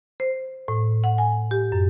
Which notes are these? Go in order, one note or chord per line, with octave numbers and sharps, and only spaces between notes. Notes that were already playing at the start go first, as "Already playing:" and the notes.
C5
A2
F#5
G#5
G4
F#2